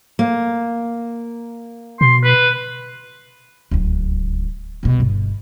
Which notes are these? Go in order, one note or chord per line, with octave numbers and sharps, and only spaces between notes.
A#3
B2 C6
B4
D1 C#2
C2 B2
G1